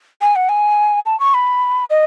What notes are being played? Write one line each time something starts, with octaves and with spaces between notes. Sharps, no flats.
G#5
F#5
G#5
A5
C#6
B5
D#5